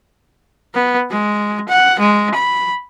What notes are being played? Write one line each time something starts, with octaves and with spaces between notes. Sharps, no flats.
B3
G#3
F#5
G#3
B5